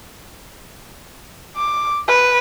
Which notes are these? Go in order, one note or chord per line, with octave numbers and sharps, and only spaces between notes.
D6
B4